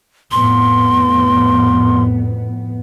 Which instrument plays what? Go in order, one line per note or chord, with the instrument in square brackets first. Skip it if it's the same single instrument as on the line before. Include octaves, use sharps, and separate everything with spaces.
[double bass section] F2 A2 B3 [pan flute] C6